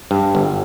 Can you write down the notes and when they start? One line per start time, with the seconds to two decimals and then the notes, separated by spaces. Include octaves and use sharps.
0.11 G2
0.35 G1